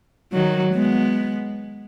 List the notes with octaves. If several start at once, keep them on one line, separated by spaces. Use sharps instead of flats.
D#3 F#3
G#3 B3